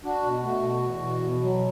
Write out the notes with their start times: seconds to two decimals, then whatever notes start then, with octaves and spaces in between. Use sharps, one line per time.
0.04 D4 F#4
0.24 B2
0.43 A3 F#4
0.63 B2
0.83 E2
1.03 B2
1.21 B2
1.42 F#3